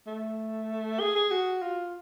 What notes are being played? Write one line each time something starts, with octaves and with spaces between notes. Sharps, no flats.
A3
G#4
G#4
F#4
F4